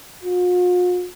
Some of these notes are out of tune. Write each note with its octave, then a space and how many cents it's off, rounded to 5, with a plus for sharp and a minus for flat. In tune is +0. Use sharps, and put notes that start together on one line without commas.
F4 +45